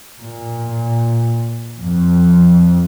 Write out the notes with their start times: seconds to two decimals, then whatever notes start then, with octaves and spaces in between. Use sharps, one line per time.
0.20 A#2
1.79 F2